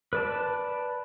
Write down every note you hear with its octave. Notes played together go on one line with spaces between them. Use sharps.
B4 D5 A5